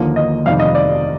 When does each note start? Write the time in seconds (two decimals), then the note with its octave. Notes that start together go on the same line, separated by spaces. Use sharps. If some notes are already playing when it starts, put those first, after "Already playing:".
Already playing: D#2 D3 F3 A#3
0.16 D#5
0.46 F1 F2 C3 D#3 G3 F5
0.60 D#5
0.75 D5